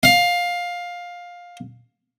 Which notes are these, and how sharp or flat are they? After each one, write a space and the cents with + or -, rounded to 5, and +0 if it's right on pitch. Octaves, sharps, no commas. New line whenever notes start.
F5 +15